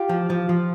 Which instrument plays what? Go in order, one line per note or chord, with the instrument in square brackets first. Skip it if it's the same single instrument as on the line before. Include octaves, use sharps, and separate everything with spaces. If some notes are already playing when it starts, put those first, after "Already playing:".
Already playing: [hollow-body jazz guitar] F4 G4
F3
F3
F3